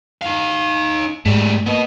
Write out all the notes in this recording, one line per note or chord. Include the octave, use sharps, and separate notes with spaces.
D#4 F5
G#2 G3 A3
A#3 B3 D#5